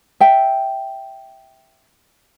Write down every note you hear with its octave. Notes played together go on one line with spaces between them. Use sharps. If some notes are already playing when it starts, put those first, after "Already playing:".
E5 G5